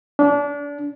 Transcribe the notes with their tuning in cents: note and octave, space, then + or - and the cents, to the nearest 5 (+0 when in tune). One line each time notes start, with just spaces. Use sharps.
D4 -30